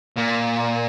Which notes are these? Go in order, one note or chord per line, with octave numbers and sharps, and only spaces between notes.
A#2